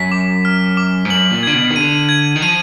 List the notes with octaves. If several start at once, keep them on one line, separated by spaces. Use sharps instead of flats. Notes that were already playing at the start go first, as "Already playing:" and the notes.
Already playing: F#2 B6
D6
F6
D6
G#2
F#2 F#7
A#2
D3 G#6
B2
D#3
D3 D#7
G#6
D#3
F3 D#7